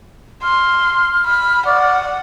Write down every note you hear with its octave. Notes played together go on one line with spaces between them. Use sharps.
C6 F6
B5
D5 F#5